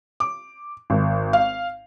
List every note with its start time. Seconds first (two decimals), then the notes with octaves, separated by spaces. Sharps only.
0.20 D6
0.90 G#1
1.33 F5